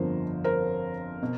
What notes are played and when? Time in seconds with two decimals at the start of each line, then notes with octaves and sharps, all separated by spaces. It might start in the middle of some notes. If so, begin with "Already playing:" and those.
Already playing: G1 F2 D3 F3 A#4 C5
0.44 A#4 C5
1.23 B2